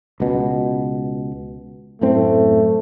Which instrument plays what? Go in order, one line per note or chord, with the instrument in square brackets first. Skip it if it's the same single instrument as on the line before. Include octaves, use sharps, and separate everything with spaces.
[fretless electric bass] C#2 B2
[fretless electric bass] F#2 A2 C4 [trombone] A3